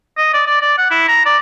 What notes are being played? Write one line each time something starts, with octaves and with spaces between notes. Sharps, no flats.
D#5
D5
D5
D5
F#5
E4
A#5
D5